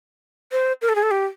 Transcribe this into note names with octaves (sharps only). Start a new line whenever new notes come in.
C5
A#4
A4
G#4
A4
G4